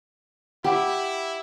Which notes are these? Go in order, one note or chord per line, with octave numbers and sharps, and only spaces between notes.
E4 G4 F#5 G5 D6